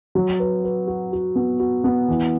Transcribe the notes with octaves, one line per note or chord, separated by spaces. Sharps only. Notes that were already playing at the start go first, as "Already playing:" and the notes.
F#3
B4
B4
F#4
F#4
B3
F#4
B3
E3